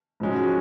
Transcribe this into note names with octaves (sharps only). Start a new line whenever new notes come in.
G#2 F3 G#3 C#4 F#4